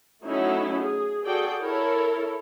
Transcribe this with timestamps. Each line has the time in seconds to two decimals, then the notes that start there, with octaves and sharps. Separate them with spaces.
0.25 F#3 A3 C#4 D#4 E4
0.80 G#4
1.25 F#4 G#4 A4 D5 G5
1.59 E4 A4 A#4 C#5